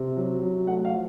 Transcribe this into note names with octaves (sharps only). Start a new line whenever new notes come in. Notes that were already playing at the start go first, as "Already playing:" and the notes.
Already playing: C3
F#3
F#3
A3 F#5
F5
F3